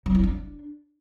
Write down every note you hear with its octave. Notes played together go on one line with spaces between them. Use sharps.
F#3
E4
D4